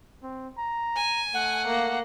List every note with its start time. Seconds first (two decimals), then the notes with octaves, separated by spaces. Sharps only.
0.23 C4
0.59 A#5
0.96 G#5
1.34 A3 F#5
1.67 A#3